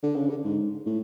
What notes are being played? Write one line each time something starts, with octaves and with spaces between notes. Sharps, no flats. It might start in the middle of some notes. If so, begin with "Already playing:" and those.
D3
C#3
D3
G#2
A2